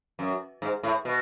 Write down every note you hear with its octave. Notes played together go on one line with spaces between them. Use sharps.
F#2
G#2
A2
B2